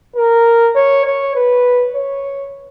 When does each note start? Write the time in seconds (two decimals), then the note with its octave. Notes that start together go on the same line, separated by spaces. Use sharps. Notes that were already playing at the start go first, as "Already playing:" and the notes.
0.16 A#4
0.75 C#5
1.05 C#5
1.35 B4
1.95 C#5